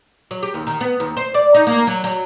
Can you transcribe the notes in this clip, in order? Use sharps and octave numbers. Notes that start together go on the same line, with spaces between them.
F#3
G4
D#2
D#3
B3
D#2
C5
D5
D#4
A#3
F#3
F#3